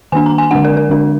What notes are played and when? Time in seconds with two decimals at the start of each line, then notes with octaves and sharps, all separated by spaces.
0.12 D#3 A#3 D4 G#5
0.26 A#5
0.38 G#5
0.51 D3 G#3 D4 F#5
0.65 A#4
0.77 A#4
0.90 D3 G#3 D4